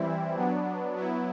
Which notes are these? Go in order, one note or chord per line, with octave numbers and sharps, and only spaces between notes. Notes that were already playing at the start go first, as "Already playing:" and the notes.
Already playing: E3 G3 C4 E4
F#3 B3 D4
F#3 B3 E4